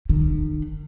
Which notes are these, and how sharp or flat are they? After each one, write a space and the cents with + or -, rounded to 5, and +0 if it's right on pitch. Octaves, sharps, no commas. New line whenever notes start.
D#3 -40